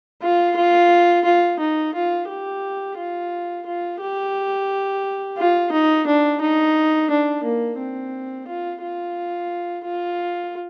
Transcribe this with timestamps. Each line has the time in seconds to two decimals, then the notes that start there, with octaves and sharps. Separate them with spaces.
0.21 F4
0.56 F4
1.25 F4
1.59 D#4
1.94 F4
2.28 G4
2.97 F4
3.66 F4
4.01 G4
5.38 F4
5.72 D#4
6.07 D4
6.41 D#4
7.11 D4
7.44 A#3
7.79 C4
8.48 F4
8.82 F4
9.85 F4